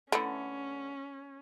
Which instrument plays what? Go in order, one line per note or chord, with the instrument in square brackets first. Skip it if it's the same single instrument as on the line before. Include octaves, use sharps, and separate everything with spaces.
[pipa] D3 B3 [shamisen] A3 E4 [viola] C#4